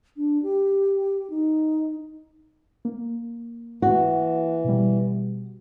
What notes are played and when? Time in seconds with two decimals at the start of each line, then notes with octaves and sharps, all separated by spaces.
0.17 D4
0.43 G4
1.30 D#4
2.85 A#3
3.82 E3 F#4
4.64 B2 G3